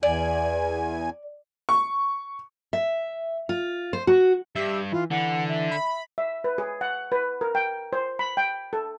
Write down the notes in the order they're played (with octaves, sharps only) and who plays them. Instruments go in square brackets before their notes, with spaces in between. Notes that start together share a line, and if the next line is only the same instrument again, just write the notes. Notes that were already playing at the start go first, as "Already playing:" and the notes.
[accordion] E2 G#5 [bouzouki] D5
[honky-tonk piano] C#6
[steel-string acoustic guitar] E5
F4
C5
F#4
[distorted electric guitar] G2 [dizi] G4 [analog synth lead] E5
[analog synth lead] E3 [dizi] F4
[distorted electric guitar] D3 [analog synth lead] E3 [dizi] F#5
[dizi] E5
[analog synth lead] B5
[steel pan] E5
B4
G#4
F#5
B4
A#4
G5
C5
B5
G5
A4